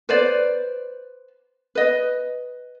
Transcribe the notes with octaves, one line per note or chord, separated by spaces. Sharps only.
B4 C5 D5
B4 D#5